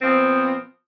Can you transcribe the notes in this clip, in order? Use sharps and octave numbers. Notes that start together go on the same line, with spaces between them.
A#2 F3 B3 C4